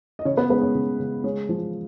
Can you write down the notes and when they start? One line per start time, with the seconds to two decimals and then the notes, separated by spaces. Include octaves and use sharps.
0.19 D#5
0.25 C#3 C#4 C#5
0.37 B3 B4
0.49 G#3 B3 B4
0.62 C#4 C#5
0.75 C#3
1.00 C#3
1.24 G#3 C#4 C#5
1.49 F3